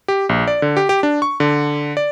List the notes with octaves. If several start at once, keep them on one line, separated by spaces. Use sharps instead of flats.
G4
A#1
D5
D3
G4
G4
D4
C#6
D3
D5